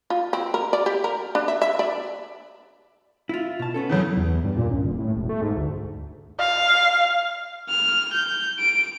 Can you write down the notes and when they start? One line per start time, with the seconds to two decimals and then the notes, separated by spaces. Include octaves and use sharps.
0.10 F4
0.33 C4
0.54 A#4
0.73 D5
0.86 G4
1.04 A#4
1.35 D4
1.48 E5
1.61 E5
1.79 D5
3.29 E4 F4
3.59 B2 A5
3.74 B3 C#4 A4
3.89 F#2 C#3 E3
4.17 E2
4.44 G2
4.57 A#2
4.71 C#2
4.84 D#1
4.99 A2
5.16 E1
5.29 A3
5.42 G#2
5.56 D2
6.40 F5
7.69 F6
8.13 G6
8.59 D7